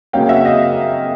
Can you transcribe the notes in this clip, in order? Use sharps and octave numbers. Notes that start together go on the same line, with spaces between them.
C#3 F#3 A#3 C#4 F5 G5
E5 F#5
D#5 F5